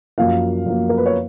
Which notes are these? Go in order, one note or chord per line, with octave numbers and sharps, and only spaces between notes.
F#2 F3 A#3 F5
F#2 F3 A#3
A#4
B4
C#5